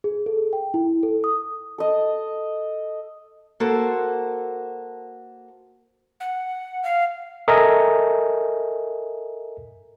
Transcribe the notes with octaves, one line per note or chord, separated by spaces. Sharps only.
G#4
A4
G5
E4
A4
D#6
A4 D#5
A#3 F#4 A4 C5
F#5
F5
A4 A#4 D#5 E5 G#5 A#5